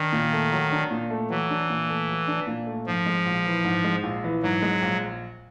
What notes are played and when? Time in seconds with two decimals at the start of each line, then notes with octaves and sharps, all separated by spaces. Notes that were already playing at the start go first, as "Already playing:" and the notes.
Already playing: D#3 D4
0.12 A#2
0.33 A3
0.52 F#3
0.72 D4
0.91 A#2
1.10 A3
1.30 E3 F#3
1.50 D4
1.70 A#2
1.89 A3
2.09 F#3
2.28 D4
2.47 A#2
2.66 A3
2.86 G#2 F3
3.06 G#3
3.26 A#1
3.46 E3
3.64 G#2
3.84 G#3
4.03 A#1
4.24 E3
4.43 G#2 F#3
4.62 G#3
4.82 A#1